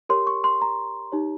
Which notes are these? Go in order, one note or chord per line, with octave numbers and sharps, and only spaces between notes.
G4 A#4 C#5 C6
C#6
C6
A#5
D#4 G4 C#5